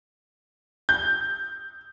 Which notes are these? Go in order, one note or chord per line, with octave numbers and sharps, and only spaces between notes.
G6